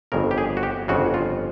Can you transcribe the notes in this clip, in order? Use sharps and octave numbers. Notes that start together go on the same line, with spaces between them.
G1 F2 C#3 A#4
G4
G#4
F#4
G4
G1 F2 C#3 F#4
F4